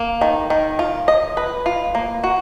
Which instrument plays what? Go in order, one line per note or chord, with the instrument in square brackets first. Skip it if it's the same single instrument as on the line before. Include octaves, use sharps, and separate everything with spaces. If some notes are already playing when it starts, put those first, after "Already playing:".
Already playing: [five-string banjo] A#3
D#3
D#3
F4
D#5
B4
F4
A#3
F#4